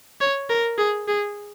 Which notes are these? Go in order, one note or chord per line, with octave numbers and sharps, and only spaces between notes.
C#5
A#4
G#4
G#4